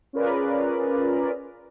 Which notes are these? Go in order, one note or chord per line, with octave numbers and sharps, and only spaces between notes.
C#4 F4 G#4 A#4 B4 D5